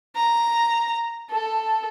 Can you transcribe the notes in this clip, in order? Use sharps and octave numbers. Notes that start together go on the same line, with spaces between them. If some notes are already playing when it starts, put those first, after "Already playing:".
A#5
A4